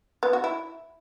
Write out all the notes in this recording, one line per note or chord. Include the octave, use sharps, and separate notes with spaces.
B3
F#4
E4